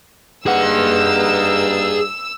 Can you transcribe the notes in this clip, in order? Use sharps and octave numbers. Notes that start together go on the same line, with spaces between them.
G2 A#3 D#4 G#4 B4 F#5 E6